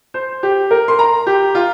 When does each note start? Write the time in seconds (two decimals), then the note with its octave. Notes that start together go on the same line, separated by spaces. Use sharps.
0.14 C5
0.43 G4
0.71 A#4
0.88 C6
0.99 A#5
1.27 G4
1.55 F4